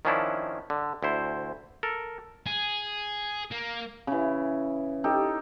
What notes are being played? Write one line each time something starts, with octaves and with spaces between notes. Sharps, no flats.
D#3 F3 C#4 D4 E4
D3
D2 E4 C5
A4 A#4
G#4
A#3
C#3 E3
D#4 G4 A4